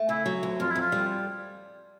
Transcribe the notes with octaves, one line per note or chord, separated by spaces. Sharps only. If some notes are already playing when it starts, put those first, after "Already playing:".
Already playing: A3
C#3 E4
F#3
D2
F2 F4
E4
F2 F4
G3